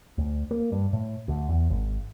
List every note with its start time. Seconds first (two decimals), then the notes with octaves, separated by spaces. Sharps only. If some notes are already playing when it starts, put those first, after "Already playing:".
0.18 D2
0.51 A#3
0.72 G2
0.93 A2
1.28 D2
1.49 E2
1.70 G#1